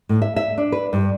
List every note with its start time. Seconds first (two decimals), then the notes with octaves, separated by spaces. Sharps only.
0.09 A2
0.22 E5
0.36 E5
0.58 D4
0.72 B4
0.93 G2